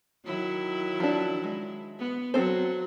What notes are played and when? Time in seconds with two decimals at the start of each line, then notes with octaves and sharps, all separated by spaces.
0.25 D#3 F#3 E4
1.00 F3 D4
1.44 G#3
1.99 B3
2.34 F#3 C4 A4 C5